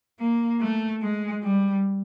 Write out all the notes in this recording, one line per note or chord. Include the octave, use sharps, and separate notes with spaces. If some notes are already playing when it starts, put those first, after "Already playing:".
A#3
A3
G#3
G3